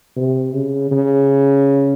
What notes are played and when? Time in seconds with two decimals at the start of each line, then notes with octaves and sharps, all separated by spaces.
0.17 C3
0.54 C#3
0.92 C#3